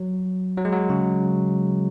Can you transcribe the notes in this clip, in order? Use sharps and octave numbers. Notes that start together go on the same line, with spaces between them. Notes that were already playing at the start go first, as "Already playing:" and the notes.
Already playing: F#3
F#3
G#3
F#3
C#3